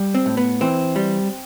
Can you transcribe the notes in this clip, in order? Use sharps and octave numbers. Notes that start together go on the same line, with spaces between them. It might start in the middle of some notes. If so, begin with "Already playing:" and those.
Already playing: G3
C4
A2
B3
E3 C4
G3